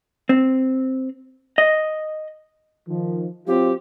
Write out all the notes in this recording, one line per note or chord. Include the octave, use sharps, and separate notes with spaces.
C4
D#5
D#3 F3
F#3 C4 F4 G4